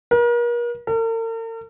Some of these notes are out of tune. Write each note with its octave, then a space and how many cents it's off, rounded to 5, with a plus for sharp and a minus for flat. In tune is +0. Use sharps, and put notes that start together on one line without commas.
A#4 +40
A#4 -45